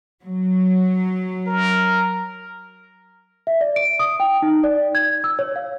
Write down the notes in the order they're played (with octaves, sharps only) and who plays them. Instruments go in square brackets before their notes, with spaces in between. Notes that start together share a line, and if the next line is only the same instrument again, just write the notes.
[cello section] F#3
[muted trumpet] A#4
[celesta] E5
D5
D7
D#6
G5
D#4
D5
G#6
E6
C#5
F5